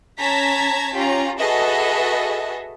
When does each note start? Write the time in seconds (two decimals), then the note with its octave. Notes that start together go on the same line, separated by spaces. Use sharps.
0.19 C#4 A5 A#5 G#6 B6
0.93 C#4 F4 G4 A#5
1.39 F#4 G#4 A4 B4 D#5 E5